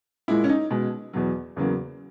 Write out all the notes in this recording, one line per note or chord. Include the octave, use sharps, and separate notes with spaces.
A#2 G#3 E4
C#4
D#4
B2 G#3
E2 B2 F#3
E2 C#3 F#3 A#3